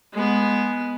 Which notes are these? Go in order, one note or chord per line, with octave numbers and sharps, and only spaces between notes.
G#3 B3